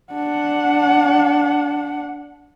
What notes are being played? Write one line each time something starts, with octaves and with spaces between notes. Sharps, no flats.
D4 F#5